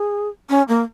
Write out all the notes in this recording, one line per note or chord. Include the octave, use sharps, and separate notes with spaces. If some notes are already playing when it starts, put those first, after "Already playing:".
Already playing: G#4
C#4
A#3